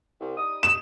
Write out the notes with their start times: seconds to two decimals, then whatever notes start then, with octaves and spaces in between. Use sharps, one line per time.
0.20 C2
0.37 G3 D#4 D#6
0.63 E7